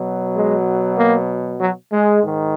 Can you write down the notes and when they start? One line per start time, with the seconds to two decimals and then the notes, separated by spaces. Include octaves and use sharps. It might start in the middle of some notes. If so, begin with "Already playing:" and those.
Already playing: B2 F#3
0.35 G#3
0.98 A#3
1.60 F#3
1.93 G#3
2.23 G#2 D#3